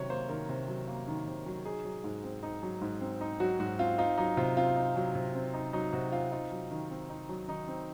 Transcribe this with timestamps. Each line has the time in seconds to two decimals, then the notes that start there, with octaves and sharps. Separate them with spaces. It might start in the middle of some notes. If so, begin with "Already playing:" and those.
Already playing: C3 D#3 F#3 C#5
0.10 A#3 C5
0.29 D#3 A#4
0.49 C3
0.68 F#3
0.88 A#3
1.07 D#3
1.27 C3
1.46 F#3
1.65 D#4 G#4
1.85 F#3
2.04 G#2
2.24 C4
2.43 D#4
2.63 F#3
2.81 G#2
3.01 C4
3.21 D#4
3.40 F#3 F#4
3.60 G#2 F#4
3.79 C4 F4
3.98 D#4 F4
4.18 F#3 D#4
4.37 C3 F4
4.57 C4 F4
4.76 D#4
4.96 F#3
5.15 C3
5.35 C4
5.54 D#4
5.73 F#3 D#4
5.93 C3 F#4
6.12 C4 F4
6.32 D#4 F4
6.51 F#3
6.71 D#3
6.91 C4
7.10 D#4
7.29 F#3
7.48 D#3 D#4
7.68 C4